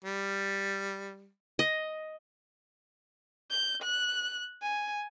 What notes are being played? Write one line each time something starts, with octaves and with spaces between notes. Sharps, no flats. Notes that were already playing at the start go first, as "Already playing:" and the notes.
G3
D#5
G6
F#6
G#5